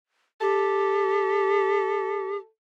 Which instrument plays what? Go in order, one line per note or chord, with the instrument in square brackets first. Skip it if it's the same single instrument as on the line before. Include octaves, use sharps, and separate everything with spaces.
[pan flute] G4 [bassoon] A4